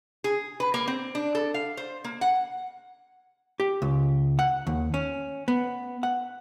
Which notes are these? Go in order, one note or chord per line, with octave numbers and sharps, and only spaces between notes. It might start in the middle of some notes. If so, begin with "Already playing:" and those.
G#4
B4
A#3
C4
D4
A4
F5
C5
A#3
F#5
G4
C#2
F#5
D#2
C#4
B3
F#5